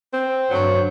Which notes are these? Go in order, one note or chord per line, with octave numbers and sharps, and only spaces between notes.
C4
G2 D3 F#3